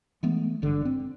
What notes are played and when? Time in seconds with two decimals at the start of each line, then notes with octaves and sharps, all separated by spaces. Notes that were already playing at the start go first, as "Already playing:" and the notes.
0.23 E3 G#3 A3 B3
0.62 G#1 G2 D3
0.85 C4